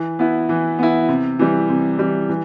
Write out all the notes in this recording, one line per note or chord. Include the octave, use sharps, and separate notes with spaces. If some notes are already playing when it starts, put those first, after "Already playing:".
Already playing: E3
B3 E4
E3
B3 E4
C3
E3 G3
C3
E3 G3
E3